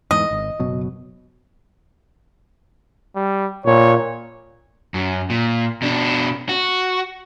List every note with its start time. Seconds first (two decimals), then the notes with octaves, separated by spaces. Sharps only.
0.11 E2 G#2 E3 D#5
0.31 G#1
0.60 F#1 B2 F#3
3.16 G3
3.66 A#2 C#5
4.94 F#2
5.30 A#2
5.82 B2 D4
6.49 F#4